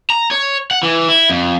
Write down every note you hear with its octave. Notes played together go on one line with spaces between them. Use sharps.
A#5
C#5
F#5
E3
E4
F2